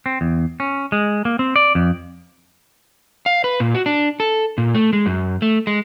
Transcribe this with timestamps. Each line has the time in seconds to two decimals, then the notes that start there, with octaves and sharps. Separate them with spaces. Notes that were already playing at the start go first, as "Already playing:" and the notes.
0.06 C4
0.21 E2
0.60 C#4
0.92 G#3
1.25 A#3
1.39 C4
1.56 D5
1.75 F2
3.26 F5
3.44 B4
3.60 A#2
3.75 F#4
3.86 D4
4.20 A4
4.58 A#2
4.75 A3
4.93 G#3
5.06 F#2
5.42 A3
5.67 G#3